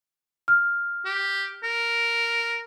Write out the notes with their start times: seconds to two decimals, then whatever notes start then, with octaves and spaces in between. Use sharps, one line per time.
0.48 F6
1.05 G4
1.63 A#4